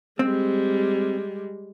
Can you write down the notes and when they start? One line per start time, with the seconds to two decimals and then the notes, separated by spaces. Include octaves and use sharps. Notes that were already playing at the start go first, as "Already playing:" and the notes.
0.19 G3 G#3 C4